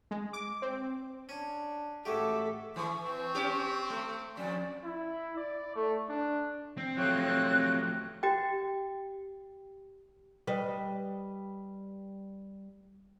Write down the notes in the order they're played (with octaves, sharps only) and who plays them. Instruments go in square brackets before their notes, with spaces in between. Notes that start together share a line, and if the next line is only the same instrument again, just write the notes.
[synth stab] G#3
D6
C4
[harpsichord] C#4 [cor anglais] D4
[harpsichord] A1 G#3 G4 [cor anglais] F#4 [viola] A4 [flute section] E5 D6
[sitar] E3 [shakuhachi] C#6
[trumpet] C4
[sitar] C#4 G4
A3
[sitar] F2 [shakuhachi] D5
[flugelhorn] E4
D5
A3
D4
[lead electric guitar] C4 [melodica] G5
[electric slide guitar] F3 F#3 A3 [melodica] G4 C#5 F5 [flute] F#6
[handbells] G4 G5
[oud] G3 B4 D#5